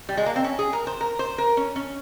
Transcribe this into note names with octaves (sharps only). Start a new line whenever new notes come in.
G3
G#3
A#3
C4
C#4
G#4
A#4
C5
A#4
C5
A#4
C#4
C#4